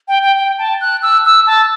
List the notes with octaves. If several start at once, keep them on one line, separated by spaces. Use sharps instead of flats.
G5
G5
G5
A5
F#6
E6
E6
A5